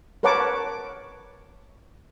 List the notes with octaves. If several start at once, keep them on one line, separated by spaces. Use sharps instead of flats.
A#4 B4 C#5 F#5 A5 D6